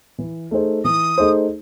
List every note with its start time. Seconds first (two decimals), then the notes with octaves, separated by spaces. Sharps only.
0.18 E3
0.51 A3 D#4 G#4 C5
0.84 E3 D#6
1.18 A3 D#4 G#4 C5